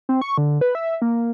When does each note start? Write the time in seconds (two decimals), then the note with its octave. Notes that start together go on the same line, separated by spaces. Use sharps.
0.09 C4
0.22 C#6
0.38 D3
0.61 B4
0.75 E5
1.02 A#3